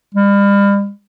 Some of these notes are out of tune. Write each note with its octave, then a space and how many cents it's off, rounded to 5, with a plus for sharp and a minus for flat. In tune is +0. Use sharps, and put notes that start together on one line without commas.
G3 +40